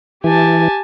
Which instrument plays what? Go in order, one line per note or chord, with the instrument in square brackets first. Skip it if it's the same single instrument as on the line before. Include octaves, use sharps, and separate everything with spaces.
[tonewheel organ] E3 [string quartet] G4 G#5 A5